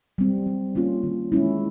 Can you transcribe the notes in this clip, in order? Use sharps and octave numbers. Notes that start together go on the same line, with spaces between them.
G3 C4
G3
A#3 C#4 F4
D#3
G#3 C#4 E4